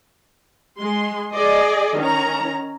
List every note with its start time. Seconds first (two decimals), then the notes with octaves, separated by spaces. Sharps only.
0.78 G#3 C6
1.33 G#4 D5 D#5
1.98 D#3 C#4 A#5